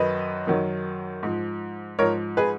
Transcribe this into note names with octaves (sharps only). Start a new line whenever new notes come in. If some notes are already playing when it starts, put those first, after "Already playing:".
Already playing: F#2 D#3 F#3 B4 D#5
F#2 D#3 F#3
G#2 F3
G#2 F3 A#4 C#5
G#4 B4